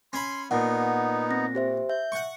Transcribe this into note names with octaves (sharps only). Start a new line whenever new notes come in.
C#4 B5 C6
A#2 B3 D#4 F#5
C4 A#6
G4 C5 E5
E5 G6
F#5 C#6